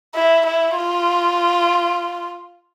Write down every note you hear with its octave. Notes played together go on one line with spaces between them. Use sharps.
E4
E4
F4